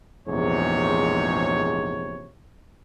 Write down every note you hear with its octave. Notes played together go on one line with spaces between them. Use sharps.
A#1 E2 G#2 C3 G#4 C#5